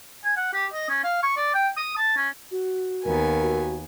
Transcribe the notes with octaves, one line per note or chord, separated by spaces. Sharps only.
G#5
F#5
G4
D#5
C#4
F5
C#6
D5
G5
D#6
A5
C#4
F#4
D#2 B3 A#4 G#5
F#4